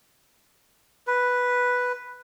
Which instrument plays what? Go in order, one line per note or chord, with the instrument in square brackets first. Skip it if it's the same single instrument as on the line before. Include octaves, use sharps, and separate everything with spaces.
[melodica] B4